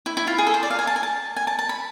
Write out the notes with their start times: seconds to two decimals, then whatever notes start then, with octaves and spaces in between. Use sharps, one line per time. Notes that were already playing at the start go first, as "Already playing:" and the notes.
0.06 E4
0.17 E4
0.27 F4
0.38 G#4
0.47 A4
0.54 C5
0.63 D5
0.70 F5
0.79 G#5
0.87 A5
0.96 G#5
1.03 A5
1.36 G#5
1.47 A5
1.59 A5
1.69 B5